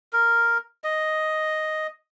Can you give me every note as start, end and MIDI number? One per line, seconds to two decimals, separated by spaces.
0.13 0.58 70
0.84 1.87 75